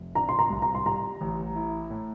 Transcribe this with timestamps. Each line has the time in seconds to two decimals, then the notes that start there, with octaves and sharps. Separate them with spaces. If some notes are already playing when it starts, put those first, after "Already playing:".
Already playing: F1
0.15 D4 A#5
0.29 C6
0.39 A#5
0.50 C2
0.62 A#5
0.75 C6
0.86 G3 A#5
1.21 A1
1.56 E4
1.90 A2